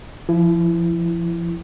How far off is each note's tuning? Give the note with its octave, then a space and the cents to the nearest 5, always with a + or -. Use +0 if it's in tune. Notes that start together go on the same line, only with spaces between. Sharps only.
F3 -25 E4 +15